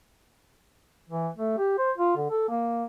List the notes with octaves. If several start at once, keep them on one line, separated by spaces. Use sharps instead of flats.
E3
A3
G4
C5
F4
D3
A4
A#3